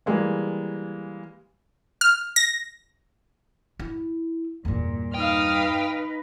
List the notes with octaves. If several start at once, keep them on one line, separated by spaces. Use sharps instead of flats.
E3 G3 G#3 A#3
F6
A#6
E4
E2 G2 A#2
D#4 B4 F5 G5 D#6 F6